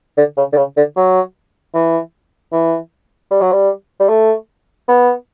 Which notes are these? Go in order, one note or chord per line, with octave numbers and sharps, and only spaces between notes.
D3
C#3
D3
C#3
D3
F#3
E3
E3
G3
F#3
G3
G3
A3
B3